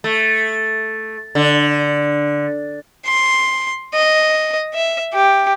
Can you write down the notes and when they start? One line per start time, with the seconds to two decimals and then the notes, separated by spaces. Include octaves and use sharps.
0.04 A3
1.35 D3
3.06 C6
3.94 D#5
4.74 E5
5.14 G4